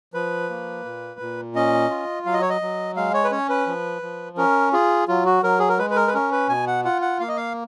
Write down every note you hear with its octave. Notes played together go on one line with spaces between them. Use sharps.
F3 B4
A#3
A#2
A#2
C#4 D#5
F4
F#3 F5
D#5
C#5
D#5
F#3
G#3 F5
C#5
B4
C#4 C#5
B4
F3
F3
C#4 A#4
F4 G#4
F#3 F4
F#4
F#3 A#4
G#4
A#4
G#3 B4
B4
A#4
B4
C#4 A#4
B4
B2 G#5
F#5
F4 F#5
F#5
A#3 F5
D#5
F5